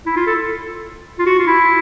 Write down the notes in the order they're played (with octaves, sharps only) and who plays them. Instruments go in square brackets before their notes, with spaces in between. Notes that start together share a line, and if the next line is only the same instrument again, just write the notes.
[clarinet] E4
F4
A4
F4
F#4
F4
E4